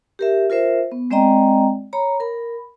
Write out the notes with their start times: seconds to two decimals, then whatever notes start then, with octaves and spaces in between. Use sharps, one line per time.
0.19 G4 A#4 E5
0.50 F4 A#4 C5 E5
0.92 B3
1.11 G#3 C4 D5 D#5 G5 A#5
1.93 C#5 A#5 B5
2.20 A#4 B5